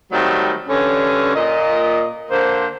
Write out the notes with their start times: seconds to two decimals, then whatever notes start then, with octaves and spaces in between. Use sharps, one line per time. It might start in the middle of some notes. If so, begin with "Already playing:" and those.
0.12 D#3 F#3 G3 A3 C4
0.69 G2 D3 C#4
1.36 A#2 D#5
2.30 D3 A#3 C5